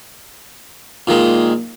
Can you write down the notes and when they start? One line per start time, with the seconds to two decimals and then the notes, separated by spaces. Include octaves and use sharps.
1.07 A#2 D#3 G#3